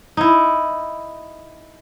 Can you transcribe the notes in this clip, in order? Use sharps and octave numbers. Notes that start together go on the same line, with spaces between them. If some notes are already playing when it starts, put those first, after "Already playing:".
D#4 E4